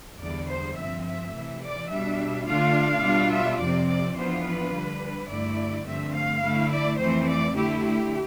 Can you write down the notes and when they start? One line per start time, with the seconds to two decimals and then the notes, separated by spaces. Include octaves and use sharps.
0.20 E2 D3 G3 B3 D5
0.48 C5
0.77 G2 F3 C4 E5
1.05 E5
1.33 C3 E3 A3
1.62 D5
1.90 B2 G3 D4 E5
2.46 D3 A3 D4 F4 F5
3.03 B2 G3 D4 F4
3.31 E5
3.59 F2 C3 F3 C4 D5
3.88 D5
4.16 F2 E3 B3 D4 F4 C5
4.44 B4
4.72 D3 G3 D4
5.28 G2 D3 A3 E4 D5
5.85 G2 D3 F3 A3 C4 E5
6.14 F5
6.42 D3 A3 E4
6.71 D5
6.99 F2 E3 A3 C4 C5
7.27 D5
7.55 D3 A3 E4 G4
7.83 G4